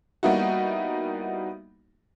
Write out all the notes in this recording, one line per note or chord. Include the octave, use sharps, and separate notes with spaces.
G3 A#3 B3 D#4 E4 F#4